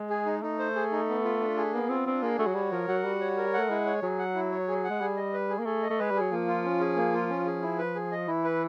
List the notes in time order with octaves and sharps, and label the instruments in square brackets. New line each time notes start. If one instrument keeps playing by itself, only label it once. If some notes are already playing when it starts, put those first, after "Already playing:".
Already playing: [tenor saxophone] G#3
[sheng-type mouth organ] G#4
D#4
[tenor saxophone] A3 [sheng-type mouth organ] D#4
[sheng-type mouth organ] C5
G#4
D#4
B3
F4
D4
G#4
[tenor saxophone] A#3 [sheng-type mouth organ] B3
[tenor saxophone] C4 [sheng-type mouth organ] F4
[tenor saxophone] C4 [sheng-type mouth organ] D4
[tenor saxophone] A#3 [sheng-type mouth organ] G#4
[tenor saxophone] A3 [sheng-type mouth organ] F#4
[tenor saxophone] F#3
[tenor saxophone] G3 [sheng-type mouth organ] C#5
[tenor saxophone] F3 [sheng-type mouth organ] A#4
[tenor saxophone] F#3 [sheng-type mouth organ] F#5
[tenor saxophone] G3 [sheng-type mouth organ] F#4
[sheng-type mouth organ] C#5
A#4
[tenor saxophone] A3 [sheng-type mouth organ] F#5
[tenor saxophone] G#3 [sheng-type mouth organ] E4
[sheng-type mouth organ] C#5
[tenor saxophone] F#3 [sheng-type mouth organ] G#4
[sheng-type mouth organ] F#5
E4
C#5
G#4
F#5
[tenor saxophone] G#3
[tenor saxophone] G3 [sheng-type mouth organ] G#4
[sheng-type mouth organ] D#5
B4
G#4
[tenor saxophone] A#3
[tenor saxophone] A3 [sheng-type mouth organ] G#4
[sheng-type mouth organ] D#5
[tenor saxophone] A3
[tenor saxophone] G#3 [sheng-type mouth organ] B4
[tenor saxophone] G3 [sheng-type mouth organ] G#4
[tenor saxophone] F#3
[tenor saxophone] F3 [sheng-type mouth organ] A#3
[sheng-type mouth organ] F4
C#4
G#4
A#3
F4
C#4
G#4
E4
B4
G#4
D#5
[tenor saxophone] E3 [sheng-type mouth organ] E4
[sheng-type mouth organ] B4